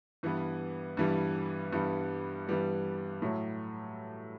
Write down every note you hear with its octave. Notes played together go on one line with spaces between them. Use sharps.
G2 E3 G3 B3
G2 E3 G3 B3
G2 E3 G3 B3
G2 E3 G3 B3
A2 F#3 A3